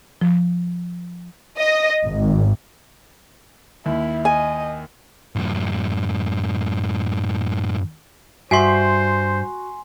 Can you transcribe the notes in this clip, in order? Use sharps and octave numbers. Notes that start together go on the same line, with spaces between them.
F3
D#5
G#1
D#2 E4
D#5 G#5
F#2 A2
G2 F#4 C5 E5 G#5 C6 C7